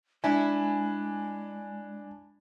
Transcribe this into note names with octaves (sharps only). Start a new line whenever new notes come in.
G#3 D4 E4 G#5